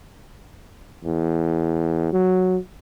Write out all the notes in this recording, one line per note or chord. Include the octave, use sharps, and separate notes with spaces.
E2
F#3